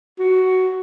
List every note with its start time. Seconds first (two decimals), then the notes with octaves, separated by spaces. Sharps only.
0.19 F#4